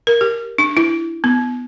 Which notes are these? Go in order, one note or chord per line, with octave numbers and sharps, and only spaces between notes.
A#4
G4
D4
E4
B3